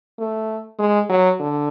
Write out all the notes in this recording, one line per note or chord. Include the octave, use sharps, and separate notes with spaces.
A3
G#3
F#3
D3